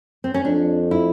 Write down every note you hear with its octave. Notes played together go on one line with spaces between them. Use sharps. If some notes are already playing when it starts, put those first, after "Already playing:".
C4
C#4
F2 D4
E4